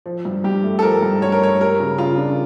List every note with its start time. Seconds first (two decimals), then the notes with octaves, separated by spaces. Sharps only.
0.06 F3
0.25 G2
0.44 G2 G4
0.64 A3
0.79 A4
0.82 F3 A#4
1.02 G2
1.22 G2 C#5
1.32 A#4
1.41 A3 C#5
1.60 G3 A#4
1.80 C#3
1.98 C#3 F4
2.18 D4